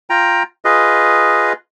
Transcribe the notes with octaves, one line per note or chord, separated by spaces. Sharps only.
F4 G5 A#5
F4 G#4 B4 D#5